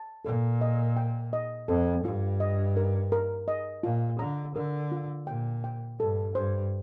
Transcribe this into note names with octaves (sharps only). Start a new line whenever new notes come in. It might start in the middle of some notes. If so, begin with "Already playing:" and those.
Already playing: A5
A#2 A4
D#5
G5
D#5
F2 A4
G2 F4
D#5
A#4
A#4
D#5
A#2 F4
D3 A#5
D3 A#4
F4
A#2 G5
G5
G2 A4
G2 C5